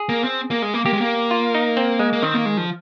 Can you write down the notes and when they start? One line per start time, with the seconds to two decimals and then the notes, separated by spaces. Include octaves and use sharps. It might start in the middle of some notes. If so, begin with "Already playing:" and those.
Already playing: G#4
0.09 A#3
0.24 C4
0.51 A#3
0.62 G#3
0.74 A#3
0.85 A#3 G4
0.93 G#3
1.01 A#3
1.31 F4
1.55 D#4
1.77 C4
1.99 G#3
2.13 A#3
2.23 D#3 C4
2.34 A#3
2.46 G#3
2.57 F3